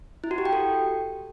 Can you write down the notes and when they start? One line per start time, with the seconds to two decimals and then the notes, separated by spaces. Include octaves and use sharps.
0.24 E4
0.31 F#4
0.38 G4
0.45 G5
0.53 A4